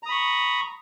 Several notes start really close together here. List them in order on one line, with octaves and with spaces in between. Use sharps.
A#5 D#6 B5 C#6